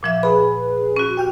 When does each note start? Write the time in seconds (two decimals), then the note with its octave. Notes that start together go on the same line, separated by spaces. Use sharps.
0.03 A#2 F3 E5
0.23 G#4 B4 B5
0.96 C#4 F#4
1.17 G4 G5 F6